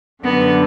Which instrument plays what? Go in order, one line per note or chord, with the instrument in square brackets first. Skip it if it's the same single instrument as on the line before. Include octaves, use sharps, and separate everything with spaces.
[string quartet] F#2 D3 G3 D4 [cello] B3